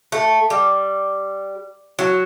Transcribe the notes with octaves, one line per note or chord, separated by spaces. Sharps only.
A3
G3
F#3